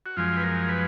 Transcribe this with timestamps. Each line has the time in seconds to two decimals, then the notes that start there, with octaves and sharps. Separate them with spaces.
0.06 F#4
0.17 F#2 F3 G#3 F4
0.37 B4
0.43 A#4
0.69 B4